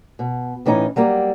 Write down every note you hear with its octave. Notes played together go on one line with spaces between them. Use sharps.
B2
A2 E3 C#4 D#4
F#3 G3 A#3